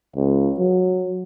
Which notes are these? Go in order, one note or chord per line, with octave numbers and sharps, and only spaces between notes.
C#2
F#3